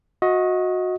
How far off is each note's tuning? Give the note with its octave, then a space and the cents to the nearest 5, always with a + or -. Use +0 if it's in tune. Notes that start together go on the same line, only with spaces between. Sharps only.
F#4 -20 D#5 +20